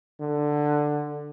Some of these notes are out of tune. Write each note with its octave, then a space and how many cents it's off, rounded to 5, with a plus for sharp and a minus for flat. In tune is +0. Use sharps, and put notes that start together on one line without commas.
D3 +10